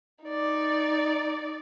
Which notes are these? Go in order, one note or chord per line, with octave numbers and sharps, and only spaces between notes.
D#4 D5